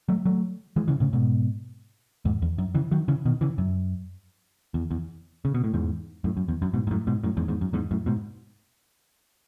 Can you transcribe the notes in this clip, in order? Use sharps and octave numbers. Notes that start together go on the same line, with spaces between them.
F#3 A3
F#3 A3
E3 G#3
C#3 E3
A2 C#3
G#2 B2
E2 G#2
E2
F#2
C#3 E3
D#3 F#3
C#3 E3
B2 D#3
C#3 E3
F#2
E2
E2
C#3
B2
A2
E2 G#2
F#2 A2
F#2
E2
F#2
G#2 B2
G#2
F#2 A2
G#2 B2
F#2 A2
E2 G#2
E2 G#2
F#2
E2 G#2
F#2 A2
G#2 B2